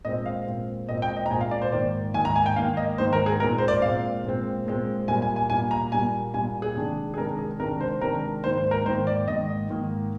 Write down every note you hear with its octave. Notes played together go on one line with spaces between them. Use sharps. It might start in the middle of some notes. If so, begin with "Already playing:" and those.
A#2 G#3 C4 D#5
F5
A#2 G#3 C4
A#2 G#3 C4 D#5
G5
D#5
A#5
A#2 G#3 C4 G#5
F5
D5
C5
G#2 D#3 A#3 D5
G#2 D#3 A#3 G#5
A#5
G#5
G5
G#2 D#3 A#3 F5
D#5
G#2 D#3 A#3 C5
A#4
G#4
A#2 G#3 C4 A#4
C5
D5
A#2 G#3 C4 F5
A#2 G#3 C4
A#2 G#3 C4
A#2 G3 A#3 G#5
G#5
G#5
A#2 G3 A#3 G#5
A#5
A#2 G3 A#3 G#5
A#2 G3 A#3 G#5
G#4
C3 D#3 G#3 D4
G#4
C3 D#3 G#3 D4 A#4
G#4
C3 D#3 G#3 D4 A#4
C5
C3 D#3 G#3 D4 A#4
G#2 D#3 A#3 C5
C5
A#4
G#2 D#3 A#3 C5
D5
G#2 D#3 A#3 D#5
G#2 D#3 A#3